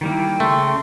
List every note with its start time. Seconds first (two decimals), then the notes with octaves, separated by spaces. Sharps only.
0.01 D#3 G3 A#3 E4 G5
0.40 C#3 A3 C6